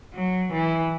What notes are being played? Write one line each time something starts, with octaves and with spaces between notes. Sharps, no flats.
F#3
E3